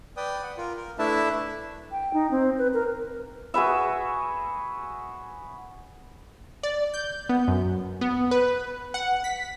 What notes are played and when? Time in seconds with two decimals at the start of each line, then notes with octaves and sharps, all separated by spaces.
0.17 B4 D5 G5 D#6
0.43 F#5
0.58 F4 A#4
0.77 A#4
0.99 A3 D4 E4 B4 E5 A5
1.92 G5
2.14 D#4
2.31 C4
2.58 B4
2.74 A#4
3.54 F#4 G#4 B4 E5
6.63 D5
6.94 G6
7.29 B3
7.48 F#2
8.01 B3
8.31 B4
8.94 F#5
9.24 B6